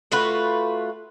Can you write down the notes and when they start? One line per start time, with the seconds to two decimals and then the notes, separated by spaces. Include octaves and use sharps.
0.12 A3 F4 F#4 B4